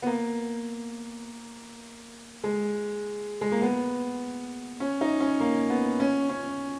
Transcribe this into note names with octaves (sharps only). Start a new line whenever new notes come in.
B3
A#3
G#3
G#3
A#3
B3
C#4
D#4
C#4
A#3
B3
C#4
C#4